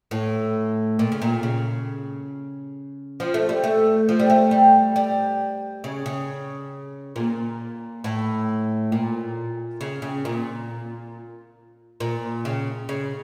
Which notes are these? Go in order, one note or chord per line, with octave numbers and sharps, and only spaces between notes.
A2
A#2
C#3
A#2
C#3
F3
A3
G3
A3
F3
G3
A3
G3
G3
C#3
C#3
A#2
A2
A#2
C#3
C#3
A#2
A#2
C#3
C#3